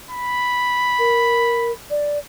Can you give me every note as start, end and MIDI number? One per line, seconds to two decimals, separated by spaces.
0.11 1.75 83
0.99 1.72 70
1.90 2.18 74